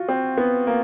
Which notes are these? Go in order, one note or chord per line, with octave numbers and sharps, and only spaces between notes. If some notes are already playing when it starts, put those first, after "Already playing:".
Already playing: F4 F#4
C4
B3
A#3